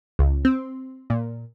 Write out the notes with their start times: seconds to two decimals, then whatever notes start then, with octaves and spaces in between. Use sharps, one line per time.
0.19 C#2
0.45 C4
1.10 A#2